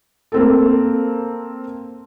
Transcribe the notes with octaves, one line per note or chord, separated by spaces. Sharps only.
A#3 C4 A4